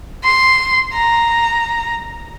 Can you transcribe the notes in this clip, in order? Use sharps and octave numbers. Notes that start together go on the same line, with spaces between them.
C6
A#5